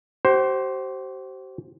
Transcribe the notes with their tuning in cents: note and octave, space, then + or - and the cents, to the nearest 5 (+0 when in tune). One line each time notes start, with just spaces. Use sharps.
G4 -45 C5 +10